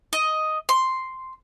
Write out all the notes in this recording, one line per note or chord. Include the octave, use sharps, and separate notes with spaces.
D#5
C6